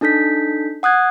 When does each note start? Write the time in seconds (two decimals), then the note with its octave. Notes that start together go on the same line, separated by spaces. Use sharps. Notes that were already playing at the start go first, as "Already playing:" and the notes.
0.01 D4 D#4 A4 G6 B6
0.83 F#5 D#6 F#6 G#6